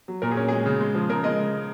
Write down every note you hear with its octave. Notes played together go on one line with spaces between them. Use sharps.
F#3
A#2 A#4
G#4
C#4
G#3 G#4
C#3
G#3
F3
C#3 A#4
G#3 D#5